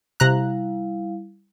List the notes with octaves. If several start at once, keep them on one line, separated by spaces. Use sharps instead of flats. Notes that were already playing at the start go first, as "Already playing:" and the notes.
C3 G3 E4 F5 A#5 F#6